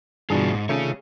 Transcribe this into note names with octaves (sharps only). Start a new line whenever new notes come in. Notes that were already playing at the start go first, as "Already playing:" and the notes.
G2 B2 D3 E3 G3 D4 F4 G#4
G#2
C3 D#3 A3 C#4 D4 F4 G#4 C#5